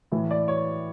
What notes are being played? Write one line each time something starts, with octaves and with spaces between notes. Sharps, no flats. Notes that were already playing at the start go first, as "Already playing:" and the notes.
A2 E3
D5
C#5